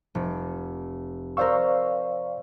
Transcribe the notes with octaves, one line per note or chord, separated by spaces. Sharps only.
F1
A#4 C5 D5 F5 C#6 E6